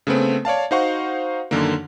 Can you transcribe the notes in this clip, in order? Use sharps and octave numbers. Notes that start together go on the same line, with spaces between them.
C#3 A3 B3 C4
C#5 D5 F5 A5
D#4 F#4 C5 F5 F#5 C#6
F#2 D3 D#3 A#3